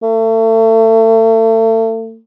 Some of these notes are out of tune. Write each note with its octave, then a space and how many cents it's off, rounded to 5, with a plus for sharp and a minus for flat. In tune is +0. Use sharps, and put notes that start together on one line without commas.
A3 +35